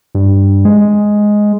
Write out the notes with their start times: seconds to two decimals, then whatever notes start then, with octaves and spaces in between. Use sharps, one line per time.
0.15 G2
0.65 G#3